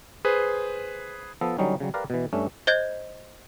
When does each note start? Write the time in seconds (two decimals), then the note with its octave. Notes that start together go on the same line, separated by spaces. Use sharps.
0.25 G#4 B4 C5
1.41 F3 B3 A4
1.58 D3 F#3 G3 C#4 D#4
1.80 C#3 F#3 G3
1.94 G4 A#4 B4 D5 F5
2.10 B2 E3
2.33 G2 A3 C#4 D4
2.67 C5 D#5 G6 G#6